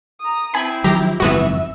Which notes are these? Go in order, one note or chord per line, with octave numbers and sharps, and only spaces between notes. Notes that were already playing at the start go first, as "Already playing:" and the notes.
A#5 D#6
C4 E4 G#5 B5
D#3 F3 F#3 G4 A#5
F#1 F2 G#2 E3 B3 F#4 E5